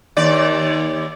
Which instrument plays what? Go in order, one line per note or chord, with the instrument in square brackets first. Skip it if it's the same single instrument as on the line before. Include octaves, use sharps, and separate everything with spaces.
[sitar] D#2 D5